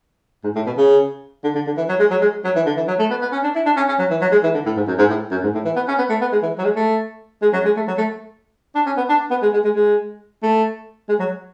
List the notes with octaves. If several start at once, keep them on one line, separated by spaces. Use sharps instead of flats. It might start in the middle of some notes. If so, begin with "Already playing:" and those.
G#2
A2
B2
C#3
D3
D3
D3
E3
F#3
G#3
F#3
G#3
F#3
E3
D3
E3
F#3
A3
B3
B3
C#4
D4
E4
D4
C#4
C#4
F#3
E3
F#3
G#3
E3
D3
A2
G#2
F#2
G#2
A2
F#2
G#2
A2
E3
B3
C#4
B3
A3
B3
G#3
E3
F#3
G#3
A3
G#3
F#3
G#3
A3
F#3
A3
D4
C#4
B3
D4
B3
G#3
G#3
G#3
G#3
A3
G#3
F#3